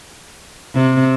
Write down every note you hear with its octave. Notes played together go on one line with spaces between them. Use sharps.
C3